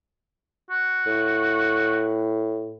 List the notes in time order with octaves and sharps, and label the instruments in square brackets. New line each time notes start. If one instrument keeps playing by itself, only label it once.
[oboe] F#4
[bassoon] A2